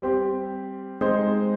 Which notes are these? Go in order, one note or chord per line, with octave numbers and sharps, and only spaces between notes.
G3 C4 G4
G#3 C4 D#4 G#4 C5